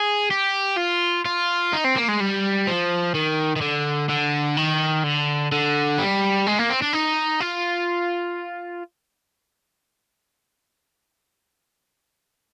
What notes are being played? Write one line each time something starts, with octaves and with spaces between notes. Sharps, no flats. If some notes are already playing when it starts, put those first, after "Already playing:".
Already playing: G#4
G4
F4
F4
D#4
C4
A#3
G#3
G3
F3
D#3
D#3
D3
D3
D#3
D3
D3
G3
G#3
A#3
C4
D4
D#4
F4